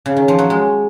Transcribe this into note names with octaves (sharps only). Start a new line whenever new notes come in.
C#3
D#3
F3
F#3
G#3